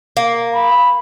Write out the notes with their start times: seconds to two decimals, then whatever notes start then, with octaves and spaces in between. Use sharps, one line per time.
0.17 A#3
0.55 B5